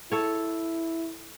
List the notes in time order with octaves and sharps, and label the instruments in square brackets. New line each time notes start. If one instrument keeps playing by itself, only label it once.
[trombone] E4 [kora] A4 C#5